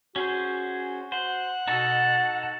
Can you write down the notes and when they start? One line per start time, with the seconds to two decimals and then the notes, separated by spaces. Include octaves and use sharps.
0.16 C#4 F#4 G#4 C5
1.12 C5 F#5
1.68 B2 D#4 F#4 A4 A5